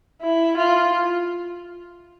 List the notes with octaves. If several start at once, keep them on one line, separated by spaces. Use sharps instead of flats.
E4
F4